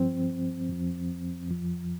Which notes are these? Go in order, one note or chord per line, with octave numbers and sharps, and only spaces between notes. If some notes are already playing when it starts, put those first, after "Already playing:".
Already playing: G2 F3 C4
F2 F3
F2 F3